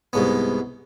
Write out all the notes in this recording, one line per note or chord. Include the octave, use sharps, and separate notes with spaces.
C2 G#2 B3